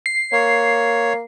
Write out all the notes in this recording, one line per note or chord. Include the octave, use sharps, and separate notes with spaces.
C7
A#3 C#5